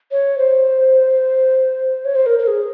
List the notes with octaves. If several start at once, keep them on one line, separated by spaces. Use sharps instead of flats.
C#5
C5
C#5
C5
A#4
A#4
G#4